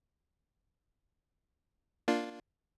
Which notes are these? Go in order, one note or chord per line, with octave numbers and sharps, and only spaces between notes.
A#3 D4 F4